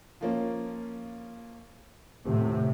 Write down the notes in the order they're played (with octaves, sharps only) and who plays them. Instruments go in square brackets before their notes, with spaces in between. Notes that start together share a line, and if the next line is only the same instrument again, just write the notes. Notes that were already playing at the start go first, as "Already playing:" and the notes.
[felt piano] F3 A#3 C#4
[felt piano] D#1 [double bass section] A2 C3